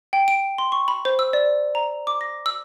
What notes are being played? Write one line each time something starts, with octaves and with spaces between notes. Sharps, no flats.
G5
D7
C6
C#6
B5
C5
E6
D5
A#5
D6
A#6
E6